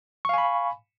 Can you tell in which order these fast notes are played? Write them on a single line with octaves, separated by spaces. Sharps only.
C#6 F5 G#5 B5